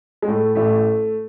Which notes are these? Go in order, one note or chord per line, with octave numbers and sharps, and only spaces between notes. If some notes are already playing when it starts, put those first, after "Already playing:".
G#3
A2 A3
A1 A3